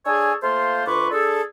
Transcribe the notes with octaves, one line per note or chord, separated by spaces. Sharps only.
D4 G#4 A4 C#5 G#5
A3 A#3 F4 C5
D2 F4 B4 C#6 D6
D4 G#4 A4